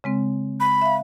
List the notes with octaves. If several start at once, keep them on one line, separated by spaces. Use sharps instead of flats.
C#3 G#3 C4
B5
E5 F5